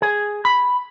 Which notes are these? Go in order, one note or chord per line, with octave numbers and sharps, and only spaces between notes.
G#4
B5